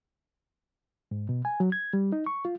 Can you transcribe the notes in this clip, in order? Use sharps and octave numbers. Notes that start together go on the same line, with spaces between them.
G#2
B2
G#5
F#3
G#6
G3
D#4
C#6
F4